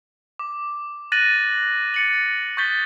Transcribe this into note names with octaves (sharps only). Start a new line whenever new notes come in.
D6
F#6 A6 A#6 D#7 F#7
A6 C#7 F#7
C#6 D#6 G6 A6 B6 G7